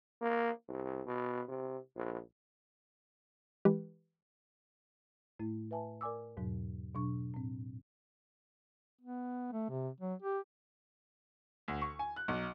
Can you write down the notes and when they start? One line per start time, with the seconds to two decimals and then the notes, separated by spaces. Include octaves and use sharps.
0.21 A#3
0.68 C2
1.06 B2
1.48 C3
1.96 A#1
3.65 E3 G#3 G4 B4
5.39 A2 A3 E4
5.71 B4 E5 G#5 A5
6.01 A#4 D5 G#5 D6 E6
6.37 E2 G#2 B2 F#3
6.95 B2 F#3 D4 C#6
7.34 A2 C4
9.01 B3
9.52 A3
9.69 C3
10.00 F#3
10.22 G4
11.68 D2
11.81 C#6
11.99 G#5
12.16 F#6
12.28 B1